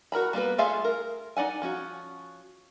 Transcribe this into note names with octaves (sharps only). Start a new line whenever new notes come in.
F#4 A#4 A#5 B5
G3 A#3 B3 B4
A3 F4 G#4 E5 F5
A#4
D#4 D5 F#5 G#5
F3 C#4 F#4